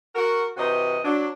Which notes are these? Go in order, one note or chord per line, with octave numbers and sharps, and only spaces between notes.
F#4 A#4
C3 E3 F#4 C5 D#5
F#3 D4